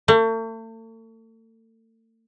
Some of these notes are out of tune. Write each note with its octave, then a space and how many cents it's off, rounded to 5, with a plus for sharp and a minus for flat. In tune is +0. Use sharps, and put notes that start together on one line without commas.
A3 +40